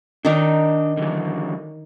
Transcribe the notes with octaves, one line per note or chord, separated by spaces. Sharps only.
D#3 D4 D#4 A#4 D5 D#5
D3 E3 F#3